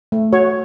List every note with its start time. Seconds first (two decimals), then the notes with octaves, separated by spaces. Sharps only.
0.12 A3
0.33 F#4 C#5